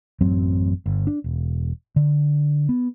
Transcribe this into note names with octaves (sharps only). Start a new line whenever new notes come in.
A1 F#2 F#3 C4
G1
D4
E1
D3
B3